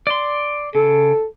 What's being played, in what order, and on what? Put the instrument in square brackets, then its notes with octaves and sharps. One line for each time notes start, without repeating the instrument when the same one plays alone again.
[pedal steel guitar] D5 C6
[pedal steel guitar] C#3 [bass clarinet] A4